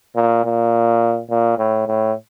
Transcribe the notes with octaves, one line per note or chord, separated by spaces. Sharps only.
A#2
A#2
A#2
A2
A2